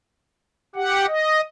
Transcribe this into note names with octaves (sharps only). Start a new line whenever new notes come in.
G4 F#5
D#5